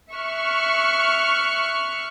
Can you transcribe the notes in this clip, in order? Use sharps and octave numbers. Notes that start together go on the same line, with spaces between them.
E5 C#6 F6 F#6